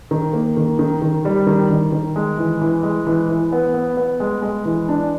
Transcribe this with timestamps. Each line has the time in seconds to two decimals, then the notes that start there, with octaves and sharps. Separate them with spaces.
0.11 D#3
0.33 A#3
0.57 D#3
0.79 D#3
1.02 D#3
1.25 G3
1.47 D#3
1.70 D#3
1.92 D#3
2.16 G#3
2.38 E3
2.61 E3
2.83 G#3
3.07 E3
3.29 E3
3.52 B3
3.74 B3
3.97 B3
4.20 G#3
4.42 G#3
4.65 E3
4.89 D4